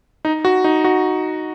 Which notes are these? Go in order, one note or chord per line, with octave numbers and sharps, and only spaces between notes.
D#4
F#4
D#4
F#4